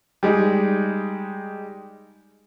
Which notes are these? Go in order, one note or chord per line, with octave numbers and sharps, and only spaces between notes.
G3 G#3 D#4